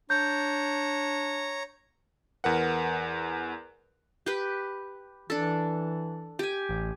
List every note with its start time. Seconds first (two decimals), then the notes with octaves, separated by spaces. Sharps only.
0.10 D4 C#5 A#5 G6
2.44 E2 A#4 B4 F#5
4.26 G4 B4
5.30 E3 D4 A4
6.39 G4 G#5
6.69 A1